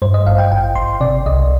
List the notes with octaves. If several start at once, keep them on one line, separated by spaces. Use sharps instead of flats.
G2 C5
D#5
G#1 F5
G5
G#1 G5
G#1 C6
C3 D5
C2 D#5